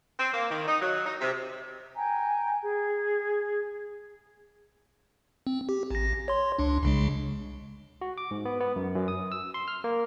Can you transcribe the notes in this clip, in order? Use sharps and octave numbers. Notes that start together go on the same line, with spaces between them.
C4
A#3
D#3
D#4
F#3
D#4
C3
G5 G#5 A#5
G#4
C4
G4
A1 A#6
C#5 C6
C#2 D4
C2 C#3 G#3
F#4
D6
G#2
B3
B3
F#2
F#2
D#6
E6
C6
F6
A#3